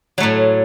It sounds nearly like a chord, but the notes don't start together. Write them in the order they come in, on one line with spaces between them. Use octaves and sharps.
F#3 A3 A2